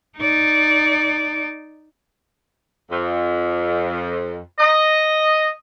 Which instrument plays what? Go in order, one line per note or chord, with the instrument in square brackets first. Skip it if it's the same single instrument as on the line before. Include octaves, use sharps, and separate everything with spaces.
[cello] D#4 D5
[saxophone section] F2
D#5